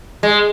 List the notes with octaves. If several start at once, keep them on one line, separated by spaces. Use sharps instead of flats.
G#3